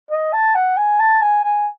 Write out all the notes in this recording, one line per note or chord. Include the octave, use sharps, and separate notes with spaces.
D#5
A5
F#5
G#5
A5
G#5
G#5